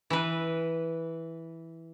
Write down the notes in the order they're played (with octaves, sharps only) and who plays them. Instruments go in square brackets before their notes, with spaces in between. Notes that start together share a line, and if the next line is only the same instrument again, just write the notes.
[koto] E3 B4